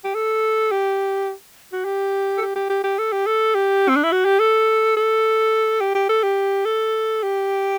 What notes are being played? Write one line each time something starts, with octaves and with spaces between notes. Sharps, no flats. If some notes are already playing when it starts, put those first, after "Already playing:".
G4
A4
G4
F#4
G4
A4
G4
G4
G4
G4
A4
G4
A4
G4
C4
D4
E4
F#4
G4
A4
A4
G4
G4
A4
G4
A4
G4